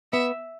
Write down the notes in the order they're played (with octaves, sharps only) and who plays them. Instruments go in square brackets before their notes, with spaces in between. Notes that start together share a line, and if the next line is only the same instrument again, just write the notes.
[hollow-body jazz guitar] B3 [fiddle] E5